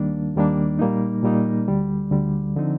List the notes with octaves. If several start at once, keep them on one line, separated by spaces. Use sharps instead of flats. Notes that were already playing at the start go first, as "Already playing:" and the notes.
Already playing: D#2 D#3 G3 A#3 D4
D#2 D#3 G3 A#3 D4
A#2 G3 A#3 D#4
A#2 G3 A#3 D#4
D2 D3 G3
D2 D3 G3
D3 F3 C4 D#4